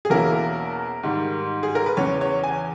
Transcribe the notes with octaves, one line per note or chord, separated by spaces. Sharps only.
G#4
E2 B2 A#3 C#4 E4 A#4
G#2 D#3 G3
G#4
A#4
B4
E2 C#3 E3 C#5
C#5
G#5